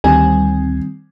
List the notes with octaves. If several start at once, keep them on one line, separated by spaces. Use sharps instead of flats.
D2 D#3 G3 C4 G#5